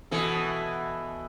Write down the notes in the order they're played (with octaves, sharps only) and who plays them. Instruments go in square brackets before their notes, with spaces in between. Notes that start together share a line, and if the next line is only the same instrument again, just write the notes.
[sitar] B2 E3 A4